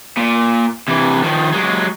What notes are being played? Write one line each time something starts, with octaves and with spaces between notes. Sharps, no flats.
A#2
C3 E3
D#3 F3
F#3 G#3